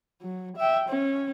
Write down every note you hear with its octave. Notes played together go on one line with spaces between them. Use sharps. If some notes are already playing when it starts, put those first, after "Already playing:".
F#3
E5 G5
C#4